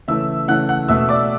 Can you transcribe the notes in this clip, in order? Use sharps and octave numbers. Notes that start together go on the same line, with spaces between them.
C#3 E3 A3 E5 E6
C#3 E3 A3 F#5 F#6
F#5 F#6
B2 A3 E5 E6
D5 D6